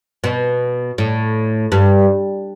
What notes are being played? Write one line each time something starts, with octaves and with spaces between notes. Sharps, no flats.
B2
A2
G2